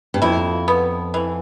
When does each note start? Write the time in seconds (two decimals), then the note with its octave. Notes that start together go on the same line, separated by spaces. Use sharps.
0.14 G2
0.22 F2 E4
0.68 B3
1.14 E3